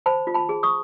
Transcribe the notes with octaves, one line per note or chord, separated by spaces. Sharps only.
C5 A5 B5
F4
A5 B5
G#4
C#6 D#6